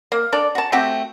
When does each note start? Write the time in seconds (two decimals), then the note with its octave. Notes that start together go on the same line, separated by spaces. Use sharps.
0.12 A#3
0.32 D4 A4 D5
0.55 F#4 A5
0.72 A3 C4 F#4 G4